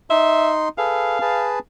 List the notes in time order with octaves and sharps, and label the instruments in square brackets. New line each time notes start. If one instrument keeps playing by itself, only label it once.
[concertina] D#4 C6 [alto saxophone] E5
[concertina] G#4 A4 B4 [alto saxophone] F5
[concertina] G#4 B4 A5